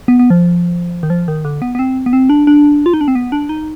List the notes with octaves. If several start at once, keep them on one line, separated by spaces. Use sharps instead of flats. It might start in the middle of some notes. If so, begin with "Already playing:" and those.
B3
B3
F3
D#3
F3
D#3
D3
B3
B3
C4
B3
C4
D4
D4
F4
D#4
D4
C4
B3
D4
D#4